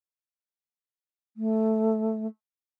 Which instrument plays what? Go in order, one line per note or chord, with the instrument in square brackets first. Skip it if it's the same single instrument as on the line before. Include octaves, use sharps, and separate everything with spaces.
[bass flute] A3